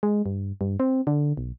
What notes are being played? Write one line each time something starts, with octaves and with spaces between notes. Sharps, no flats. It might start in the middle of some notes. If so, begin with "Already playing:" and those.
G#3
G2
G2
C4
D3
B1